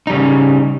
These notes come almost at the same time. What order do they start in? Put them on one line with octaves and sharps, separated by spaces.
D#4 G3 C#3